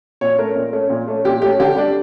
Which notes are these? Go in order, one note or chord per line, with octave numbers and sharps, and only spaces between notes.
A#2 C#5
A3 C#4 A#4
A#2
A3 C#4
A#2
A3 C#4
A#2 G4
A3 C#4 G4
D3 G4
G3 D4